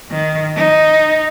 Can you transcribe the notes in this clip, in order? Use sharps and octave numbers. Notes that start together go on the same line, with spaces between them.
D#3
D#4